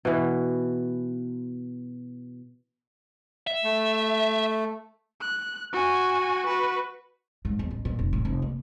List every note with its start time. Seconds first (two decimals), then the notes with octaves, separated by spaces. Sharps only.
0.05 B2 E3
3.47 E5
3.64 A3
5.21 F#6
5.73 F#4 G#5
6.46 F#4 B4
7.45 G#2
7.59 E2
7.71 A1
7.85 A#2
7.99 F1
8.13 A2
8.25 F1
8.42 A#3